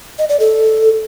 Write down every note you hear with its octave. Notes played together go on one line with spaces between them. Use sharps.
D#5
D5
A4